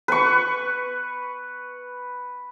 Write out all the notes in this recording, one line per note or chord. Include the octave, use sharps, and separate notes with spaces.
B4 C#6